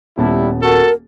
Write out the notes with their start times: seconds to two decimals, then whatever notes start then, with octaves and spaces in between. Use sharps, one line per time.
0.18 D#1 G3 B3 E4 A5
0.62 F#4 A4 A#4